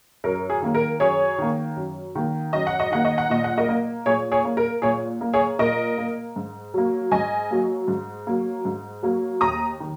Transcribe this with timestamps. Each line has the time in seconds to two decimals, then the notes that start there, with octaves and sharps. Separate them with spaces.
0.24 F#2 A#4
0.50 G#4
0.62 D#3 A#3
0.75 A#4
1.00 F#2 G#4 C#5
1.38 D#3 A#3
1.76 F#2
2.15 D#3 A#3
2.53 F#2 D#5
2.67 F#5
2.80 D#5
2.91 D#3 A#3 F#5
3.05 D#5
3.18 F#5
3.30 A#2 D#5
3.44 F#5
3.58 A#4 D#5
3.68 A#3
4.05 A#2 G#4 C#5
4.32 G#4 C#5
4.45 A#3
4.57 A#4
4.82 A#2 G#4 C#5
5.21 A#3
5.33 G#4 C#5
5.59 A#2 A#4 D#5
5.98 A#3
6.36 G#2
6.74 F#3 A#3
7.11 G#2 D#5 G#5
7.51 F#3 A#3
7.88 G#2
8.27 F#3 A#3
8.65 G#2
9.03 F#3 A#3
9.41 D#2 A#5 D#6
9.80 D#3